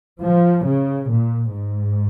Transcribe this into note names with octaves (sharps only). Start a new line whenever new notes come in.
F3
C#3
A#2
G#2